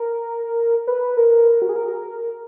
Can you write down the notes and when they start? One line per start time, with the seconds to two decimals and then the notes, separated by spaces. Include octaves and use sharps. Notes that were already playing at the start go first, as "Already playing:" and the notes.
Already playing: A#4
0.87 B4
1.17 A#4
1.62 F#4
1.69 G#4
1.76 A#4